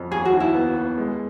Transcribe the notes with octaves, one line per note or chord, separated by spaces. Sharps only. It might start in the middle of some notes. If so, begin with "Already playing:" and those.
Already playing: F2
D#2 G#4
F#4
D#3
E4
B3
B3
G#3